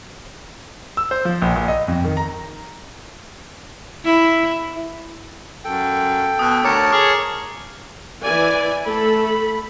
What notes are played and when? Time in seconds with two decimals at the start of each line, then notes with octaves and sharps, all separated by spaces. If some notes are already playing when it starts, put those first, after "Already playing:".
0.97 E6
1.11 C5
1.25 F3
1.42 A#1
1.56 A#1
1.68 D#5
1.88 F2
2.04 D#3
2.17 A#5
4.04 E4
5.64 F#2 A4 G5
6.39 B2 D#6
6.64 D2 A#4 C#5 A5 D6 C#7
6.92 G#4 D6 F6
8.24 E3 D5 G#5
8.86 A3 A4 B5